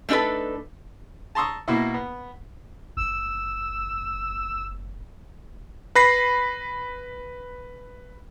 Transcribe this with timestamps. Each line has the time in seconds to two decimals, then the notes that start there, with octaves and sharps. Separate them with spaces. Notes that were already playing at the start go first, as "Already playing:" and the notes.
0.09 A3 D4 D#4 A4 B4
1.35 A5 A#5 C6 C#6 D#6 E6
1.68 B2 A#3 E4
1.94 B3
2.97 F#1 E6
5.95 B4 B5 A#6 C7